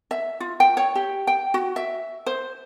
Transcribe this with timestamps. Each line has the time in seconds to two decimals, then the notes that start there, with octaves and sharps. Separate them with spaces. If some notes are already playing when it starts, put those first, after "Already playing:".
0.11 E5
0.40 F4
0.60 G5
0.77 C#5
0.95 G4
1.27 G5
1.54 F#4
1.76 E5
2.26 C5